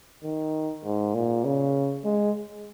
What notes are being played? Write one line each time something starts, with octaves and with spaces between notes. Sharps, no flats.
D#3
G#2
A#2
C#3
G#3